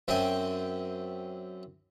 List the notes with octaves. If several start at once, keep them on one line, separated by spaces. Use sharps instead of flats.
F#2 C4 E5 G5 G#5